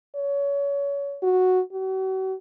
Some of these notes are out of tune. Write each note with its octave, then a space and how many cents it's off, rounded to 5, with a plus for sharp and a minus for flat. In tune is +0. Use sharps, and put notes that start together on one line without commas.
C#5 +25
F#4 -5
F#4 +40